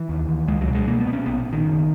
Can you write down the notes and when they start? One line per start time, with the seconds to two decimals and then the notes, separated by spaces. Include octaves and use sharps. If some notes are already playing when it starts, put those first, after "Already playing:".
Already playing: E3
0.09 D#2
0.28 D#2
0.48 C#2 G#3
0.61 F#3
0.68 B2
0.75 G#3
0.87 B2 A#3
1.00 B3
1.07 B2
1.13 C#4
1.26 A#1 B3
1.46 A#1
1.53 D#3
1.65 F#1